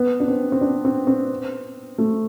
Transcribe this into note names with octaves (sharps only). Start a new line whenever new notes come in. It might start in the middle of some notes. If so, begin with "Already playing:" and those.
Already playing: B3
D4
C4
C4
D4
C4
C4
A3